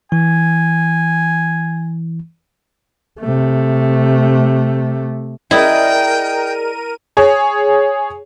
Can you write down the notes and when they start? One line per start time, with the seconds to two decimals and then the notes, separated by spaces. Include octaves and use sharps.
0.12 E3 G#5
3.21 C3 A3
5.51 E4 G#4 A#4 D5 D#5 G5 D#7
7.17 G#4 C#5